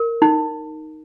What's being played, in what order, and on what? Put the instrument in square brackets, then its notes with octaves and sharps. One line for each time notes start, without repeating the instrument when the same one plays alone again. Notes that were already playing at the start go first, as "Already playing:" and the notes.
Already playing: [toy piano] A#4
D#4